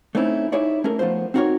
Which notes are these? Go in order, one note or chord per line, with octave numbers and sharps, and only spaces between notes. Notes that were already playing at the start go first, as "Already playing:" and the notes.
A3 C4 C#4 D#4 E4
D#4 E4 G#4 C#5 D5
A3 C#4 G#4 A#4
F3 A3 B3 F4 C5
C4 D#4 F#4 A4 A#4 C#5